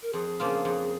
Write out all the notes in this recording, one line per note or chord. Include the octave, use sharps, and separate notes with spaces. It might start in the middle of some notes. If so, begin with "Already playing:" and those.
A#4
F2 G#4
C#3 F3 A#3 F4
F2